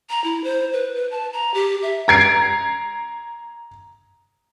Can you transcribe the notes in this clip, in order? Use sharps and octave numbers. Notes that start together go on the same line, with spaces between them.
A#5
E4
C5
B4
B4
A5
A#5
G4
E5
A#5 G#6 C7 D7